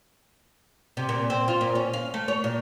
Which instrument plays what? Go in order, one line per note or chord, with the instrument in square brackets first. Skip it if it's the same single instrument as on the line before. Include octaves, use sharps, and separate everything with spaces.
[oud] C3
A#2
C4
F4
A#2
C#4
F5
A3
C#5
A#2